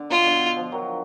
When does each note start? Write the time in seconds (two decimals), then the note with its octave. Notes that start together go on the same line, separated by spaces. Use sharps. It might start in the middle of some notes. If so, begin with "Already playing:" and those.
Already playing: D3
0.10 B2 F4
0.26 D3
0.56 F3
0.72 D#3 F#3